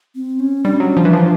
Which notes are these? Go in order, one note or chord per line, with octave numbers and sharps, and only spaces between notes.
C4
C#4
G3 D4
F#3
F3
E3
F3